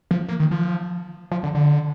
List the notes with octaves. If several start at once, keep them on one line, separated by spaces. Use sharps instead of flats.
F3
A#3
D#3
F3
F3
D3
D3